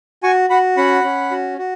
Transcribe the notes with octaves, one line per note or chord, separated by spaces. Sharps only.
F#4 G#5 C#6
F#4 F#5 B5
C#4 F#5 B5
C#4
F#4
F#4